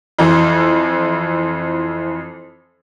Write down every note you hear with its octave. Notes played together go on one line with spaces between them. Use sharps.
F2 E3 E4 C5 C6